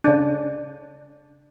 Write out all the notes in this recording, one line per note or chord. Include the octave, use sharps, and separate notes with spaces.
C#3 D4